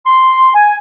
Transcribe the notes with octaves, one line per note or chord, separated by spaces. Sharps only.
C6
G#5